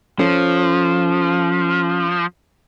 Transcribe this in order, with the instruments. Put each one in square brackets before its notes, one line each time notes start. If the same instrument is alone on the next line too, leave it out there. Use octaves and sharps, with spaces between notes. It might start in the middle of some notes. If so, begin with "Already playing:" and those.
[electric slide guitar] F3 [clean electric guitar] C#4 A4 C#5